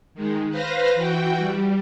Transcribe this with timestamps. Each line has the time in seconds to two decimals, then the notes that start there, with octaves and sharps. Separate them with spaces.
0.14 D#3 G#3
0.49 B4 C5 F5 A#6
0.95 E3 F#4 G5
1.38 G3